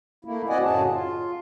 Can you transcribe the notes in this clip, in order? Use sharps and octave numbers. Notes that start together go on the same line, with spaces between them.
A3 A#3 E4
C4 F#4 D5 D#5 F#5 G#5
F#2 A2 C#3 F#4 G#4 A5
F4